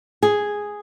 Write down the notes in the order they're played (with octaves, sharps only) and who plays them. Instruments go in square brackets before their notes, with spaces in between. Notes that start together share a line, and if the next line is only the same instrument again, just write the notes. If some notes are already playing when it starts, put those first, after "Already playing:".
[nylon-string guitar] G#4